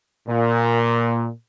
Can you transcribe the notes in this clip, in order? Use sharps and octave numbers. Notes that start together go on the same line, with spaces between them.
A#2